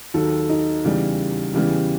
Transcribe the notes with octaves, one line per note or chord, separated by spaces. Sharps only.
D#2 D#3 F#3 A4
D#4
E2 C#3 E3 G3
E2 C#3 E3 G3